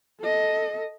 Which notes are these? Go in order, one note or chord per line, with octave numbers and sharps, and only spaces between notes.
A4 D#5